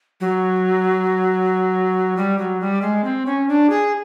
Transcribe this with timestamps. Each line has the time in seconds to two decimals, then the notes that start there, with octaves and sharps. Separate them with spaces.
0.21 F#3
2.17 G3
2.38 F#3
2.61 G3
2.82 G#3
3.04 C4
3.26 C#4
3.48 D4
3.70 G#4